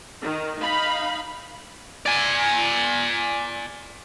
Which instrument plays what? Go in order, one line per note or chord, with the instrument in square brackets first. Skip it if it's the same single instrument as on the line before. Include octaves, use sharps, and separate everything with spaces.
[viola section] D#3
D#4 F5 B5
[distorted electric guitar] D5 G#5